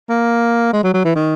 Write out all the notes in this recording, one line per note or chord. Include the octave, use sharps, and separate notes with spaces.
A#3
G#3
F#3
F#3
E3
D#3